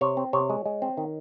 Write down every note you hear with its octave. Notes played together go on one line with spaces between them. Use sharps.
C3 C#5
C4
C3 C#5
G#3
G#3
C4
D#3